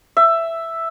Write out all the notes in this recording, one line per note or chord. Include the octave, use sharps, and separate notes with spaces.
E5